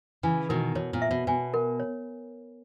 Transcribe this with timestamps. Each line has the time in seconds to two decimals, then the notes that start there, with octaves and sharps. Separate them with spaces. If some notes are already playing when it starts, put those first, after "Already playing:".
0.23 C#3 E3 G#5
0.49 B2 D#3 A#4
0.75 B2 C#5
0.93 A#2
1.02 E5
1.11 B2
1.27 B2 G#5
1.54 A#4
1.80 C#5